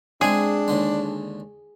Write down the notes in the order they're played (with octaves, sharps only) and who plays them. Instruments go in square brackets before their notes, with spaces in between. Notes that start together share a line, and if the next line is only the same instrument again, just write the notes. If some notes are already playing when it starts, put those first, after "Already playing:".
[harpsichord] G#3 C4 E4 [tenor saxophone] D4 [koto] G#4
[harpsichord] D#2 D3 G#3